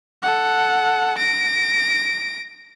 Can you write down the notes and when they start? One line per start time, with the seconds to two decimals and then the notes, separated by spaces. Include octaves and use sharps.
0.23 A4 F#5
1.18 A#6 D7